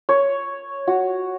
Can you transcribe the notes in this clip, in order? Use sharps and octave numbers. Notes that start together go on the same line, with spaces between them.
C#5
F#4